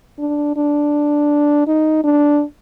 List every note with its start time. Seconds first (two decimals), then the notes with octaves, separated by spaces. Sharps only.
0.19 D4
0.56 D4
1.67 D#4
2.04 D4